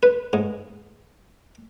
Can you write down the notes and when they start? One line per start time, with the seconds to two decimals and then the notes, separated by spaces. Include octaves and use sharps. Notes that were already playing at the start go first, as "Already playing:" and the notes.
0.03 B4
0.33 G#2